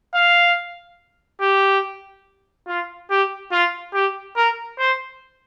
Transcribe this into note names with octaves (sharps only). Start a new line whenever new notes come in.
F5
G4
F4
G4
F4
G4
A#4
C5